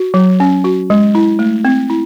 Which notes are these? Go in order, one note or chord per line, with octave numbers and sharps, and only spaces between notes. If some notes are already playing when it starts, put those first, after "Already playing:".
Already playing: F#4
F#3
C#4
F#4
G#3
E4
A3
C4
E4